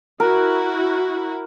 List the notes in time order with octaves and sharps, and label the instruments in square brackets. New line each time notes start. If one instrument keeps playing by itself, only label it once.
[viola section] E4 F#4 [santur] A#4